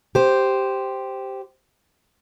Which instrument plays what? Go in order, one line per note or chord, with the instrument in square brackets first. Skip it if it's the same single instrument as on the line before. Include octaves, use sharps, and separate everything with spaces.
[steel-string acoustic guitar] G4 C5